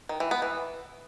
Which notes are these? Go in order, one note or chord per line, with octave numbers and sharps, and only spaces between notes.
D#3
E3
B3
E3